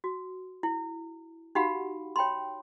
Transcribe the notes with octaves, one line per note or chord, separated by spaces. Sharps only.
F#4
E4
D#4 F#4 G4 F5 F#5 B5
C#5 G5 B5 C6